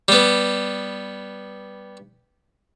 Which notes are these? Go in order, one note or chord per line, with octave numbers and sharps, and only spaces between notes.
G3 B3